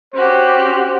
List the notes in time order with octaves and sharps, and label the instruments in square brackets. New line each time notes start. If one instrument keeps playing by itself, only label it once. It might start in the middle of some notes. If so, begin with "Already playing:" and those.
[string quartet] C#4 F#4 G4 [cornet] C5